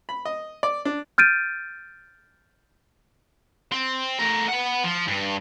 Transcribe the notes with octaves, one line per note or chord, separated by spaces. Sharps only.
B5
D#5
D5
D4
F6 G6 A6 D7 D#7
C4
A3 A#4
F#5 B5
F3
G2